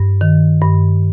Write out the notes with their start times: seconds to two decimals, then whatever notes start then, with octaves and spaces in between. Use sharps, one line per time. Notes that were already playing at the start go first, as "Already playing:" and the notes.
Already playing: G2
0.21 D#3
0.61 G2